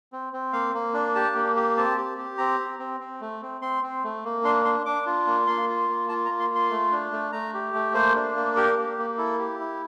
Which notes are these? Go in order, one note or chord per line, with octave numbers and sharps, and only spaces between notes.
C4
C4
A#3 F5
A#3
D4
G4 A5
A#3
G4
C4 A5
G4
G4
C4 A#5
C4
C4
C4
A3
C4
C4 C6
C4
A3
A#3
D4 C6
D4 C6
D4 D6
F4
A#3
A#3 C6
F4
A#3
F4 A5
A#5
A#3
C6
F4
C6
A3
D4
A3
A3 A#5
G4
A3
A#3 C5
D4
A#3
G4 A#4
A#3
A#3
E4 A4
G4
E4